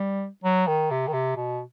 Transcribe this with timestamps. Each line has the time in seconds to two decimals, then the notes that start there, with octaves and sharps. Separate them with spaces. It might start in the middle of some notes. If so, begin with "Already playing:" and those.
Already playing: G3
0.44 F#3
0.67 D#3
0.91 C3
1.07 D#3
1.13 C3
1.36 B2